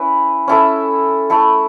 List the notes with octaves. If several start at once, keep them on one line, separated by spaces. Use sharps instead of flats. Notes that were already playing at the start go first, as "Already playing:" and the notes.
Already playing: C#4 E4 B4
C#4 E4 A4 E5
A3 E4 A4